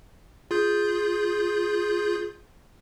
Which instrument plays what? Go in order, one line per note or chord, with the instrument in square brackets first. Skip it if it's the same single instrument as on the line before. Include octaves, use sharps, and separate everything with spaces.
[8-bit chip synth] F4 G#4 G6